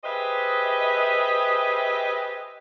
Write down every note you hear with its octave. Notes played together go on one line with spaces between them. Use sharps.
G4 G#4 B4 C5 D#5 E5